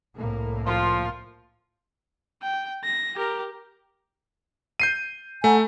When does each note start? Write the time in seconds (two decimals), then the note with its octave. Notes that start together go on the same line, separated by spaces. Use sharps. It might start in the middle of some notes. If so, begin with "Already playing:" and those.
0.17 C2 A2 A#3
0.67 F3 F4
2.42 G5
2.84 A#6
3.15 G4 A#4
4.80 G6 C7 D#7
5.44 A3 F#5 G#5 A#5